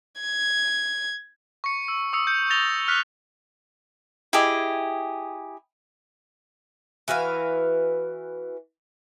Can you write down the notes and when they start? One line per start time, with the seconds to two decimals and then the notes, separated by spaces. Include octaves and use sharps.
0.21 G#6
1.64 C#6 C#7
1.88 E6
2.13 C#6 D#6 E6 C#7
2.27 G6 C#7
2.50 A6 A#6 F7 G7
2.88 F6 F#6 B6
4.33 E4 G4 G#4 D#5
7.08 E3 F#4 B4 F5